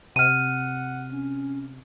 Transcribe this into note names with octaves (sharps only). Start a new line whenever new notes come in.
C3 F#5 F6 D#7
C#4